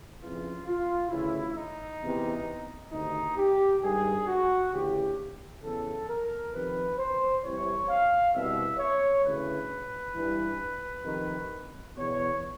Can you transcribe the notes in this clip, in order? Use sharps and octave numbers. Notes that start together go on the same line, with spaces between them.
F2 C#3 E3 F4
F4
D2 C#3 E3 E4
D#4
E2 C3 E3
D2 C3 D#3 D#4
G4
G2 D#3 G#4
F#4
D2 C#3 E3 G4
E2 C#3 E3 A4
A#4
F2 C3 D#3 B4
C5
C2 C3 E3 C#5
F5
C2 B2 E5
C#5
D2 C#3 E3 B4
G2 E3
F2 C3 D#3
E2 B2 C#5